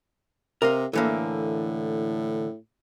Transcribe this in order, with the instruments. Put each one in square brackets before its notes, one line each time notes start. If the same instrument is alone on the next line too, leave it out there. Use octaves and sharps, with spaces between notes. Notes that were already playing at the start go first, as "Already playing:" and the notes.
[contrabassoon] C3 [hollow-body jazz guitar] A#4 D#5 F5
[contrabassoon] A2 [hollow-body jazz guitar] D3 E3 A#3